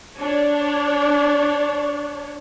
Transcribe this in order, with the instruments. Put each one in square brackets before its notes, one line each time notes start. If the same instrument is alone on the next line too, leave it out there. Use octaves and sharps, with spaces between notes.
[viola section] D4 C#5